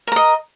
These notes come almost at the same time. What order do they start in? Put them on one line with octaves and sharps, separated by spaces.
A#4 A#5 D#5